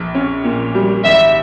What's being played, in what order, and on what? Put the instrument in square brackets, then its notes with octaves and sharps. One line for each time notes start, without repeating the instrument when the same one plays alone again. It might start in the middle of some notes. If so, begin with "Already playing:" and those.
Already playing: [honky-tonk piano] A#1
C#4
A#2
G3
[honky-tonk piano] G#1 [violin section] E5